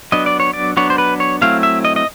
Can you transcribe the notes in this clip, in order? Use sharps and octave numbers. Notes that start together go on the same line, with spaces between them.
F#3 B3 D4 D#5
D5
C#5
D5
F#3 B3 D4 C#5
C5
B4
C#5
F#3 A3 C4 E4 F5
E5
D#5
D#5